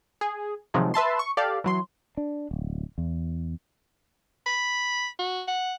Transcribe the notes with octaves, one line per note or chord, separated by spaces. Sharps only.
G#4
C3 D#3 F3 F#3 G#3
B4 E5 A5 C6
C#6
G4 A4 D5 F5
E3 F#3 C6
D4
D1
E2
B5
F#4
F#5